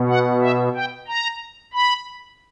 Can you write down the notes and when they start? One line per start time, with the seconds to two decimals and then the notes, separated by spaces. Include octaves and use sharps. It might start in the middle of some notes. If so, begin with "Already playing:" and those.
Already playing: B2
0.09 F#5
0.42 E5
0.75 G5
1.08 A#5
1.73 B5